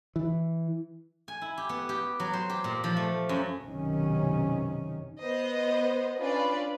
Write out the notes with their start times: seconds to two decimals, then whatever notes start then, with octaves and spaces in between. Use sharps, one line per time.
0.16 E3
1.28 G#5
1.42 E4
1.58 G4
1.69 B3
1.89 G4
2.20 F#3
2.33 C5
2.50 G4
2.64 A#2
2.84 F3
2.97 A3
3.29 F#2
3.62 B1 F#2 C3 D#3 C#4
5.20 B3 C5 D#5
6.18 C#4 D4 F4 B4 D5